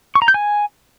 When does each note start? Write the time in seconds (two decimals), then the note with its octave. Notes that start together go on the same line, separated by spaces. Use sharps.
0.15 C#6
0.22 A#5
0.28 G6
0.34 G#5